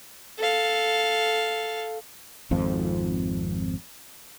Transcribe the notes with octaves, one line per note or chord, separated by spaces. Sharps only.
A4 F5
G#1 F2 F3